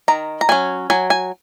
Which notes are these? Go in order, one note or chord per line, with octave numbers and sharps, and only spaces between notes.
D#3 A#5
A#5
F#3 C#4 G#5
F#3 G#5
G#5